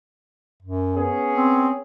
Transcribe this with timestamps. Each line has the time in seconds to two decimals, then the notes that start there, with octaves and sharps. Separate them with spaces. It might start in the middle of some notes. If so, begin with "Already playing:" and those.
0.62 F#2
0.96 B3 C#4 G#4
1.35 C4